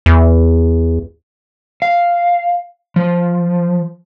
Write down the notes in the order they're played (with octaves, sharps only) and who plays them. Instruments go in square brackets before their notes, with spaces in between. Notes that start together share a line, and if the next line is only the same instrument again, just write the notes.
[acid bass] E2
[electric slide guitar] F5
F3